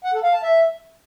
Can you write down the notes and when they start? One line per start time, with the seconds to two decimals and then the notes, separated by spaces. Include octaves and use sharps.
0.04 F#5
0.14 A4
0.23 F5
0.33 A5
0.43 E5